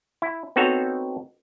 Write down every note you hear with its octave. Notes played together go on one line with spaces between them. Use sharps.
E4
B3 C4 D#4 F#4 A4 C#5